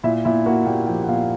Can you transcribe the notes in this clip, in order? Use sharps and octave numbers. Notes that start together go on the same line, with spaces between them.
A#2 E4 E5
A#2 E4 E5
A#3 F#4 F#5
A#2 G4 G5
F3 G4 G5
F#5
A#2 F4 F5